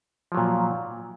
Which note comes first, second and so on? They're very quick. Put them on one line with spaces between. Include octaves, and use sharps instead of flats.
F3 F#3 A#2